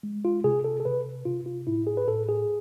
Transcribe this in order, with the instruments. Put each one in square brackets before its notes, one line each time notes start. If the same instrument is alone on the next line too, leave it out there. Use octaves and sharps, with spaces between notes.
[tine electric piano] G#3
F4
C3 G#4
A4
A4
C3 B4
C3 F4
F4
A2 E4
G#4
B4
A2 A4
G#4